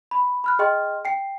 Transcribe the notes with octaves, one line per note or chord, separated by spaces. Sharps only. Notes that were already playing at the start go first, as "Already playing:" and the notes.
B5
B5 F6 F#6
G#4 D#5 G5 C6 F6
G5 C7